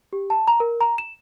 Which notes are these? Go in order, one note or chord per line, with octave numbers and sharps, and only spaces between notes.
G4
A5
A#5
A#4
A#5
E7